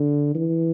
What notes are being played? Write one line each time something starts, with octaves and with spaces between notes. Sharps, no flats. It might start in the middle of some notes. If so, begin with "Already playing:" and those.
Already playing: D3
E3